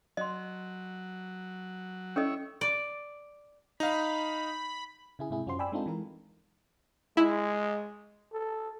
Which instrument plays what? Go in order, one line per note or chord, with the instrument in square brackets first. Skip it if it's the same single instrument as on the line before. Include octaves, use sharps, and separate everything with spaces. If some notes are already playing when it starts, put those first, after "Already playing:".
[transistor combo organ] F#3 [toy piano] D#5 C6
[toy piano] C#4 A4 D#5 [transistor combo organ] E4 C#5
[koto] D5
[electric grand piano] D#4 F5 [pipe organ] B5
[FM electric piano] C#3 E4 G#4
G#2 C3 E4 G#4
F#2 C#4 F4 F#4 C5 C6
D5 G5 G#5 B5 E6
G#3 C4 D4 D#4 F4 A4
E3 G#3 A#4
[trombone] G#3 [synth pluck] E4
[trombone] A4